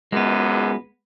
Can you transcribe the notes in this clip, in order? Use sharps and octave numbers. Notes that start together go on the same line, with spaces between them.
G#1 C#2 F#2 G#3 B3